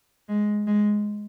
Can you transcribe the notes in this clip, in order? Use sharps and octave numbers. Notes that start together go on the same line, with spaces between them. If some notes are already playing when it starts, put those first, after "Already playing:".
G#3
G#3